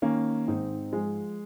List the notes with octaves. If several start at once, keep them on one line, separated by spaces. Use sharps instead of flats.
D#3 A#3 C#4
G#2 C4 D#4
F3 G#3